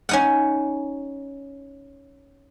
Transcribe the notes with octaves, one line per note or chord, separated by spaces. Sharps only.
C#4 D#4 F#5